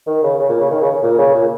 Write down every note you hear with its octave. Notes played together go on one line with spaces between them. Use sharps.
D#3
C#3
C#3
A#2
C#3
D#3
C#3
A#2
C#3
A#2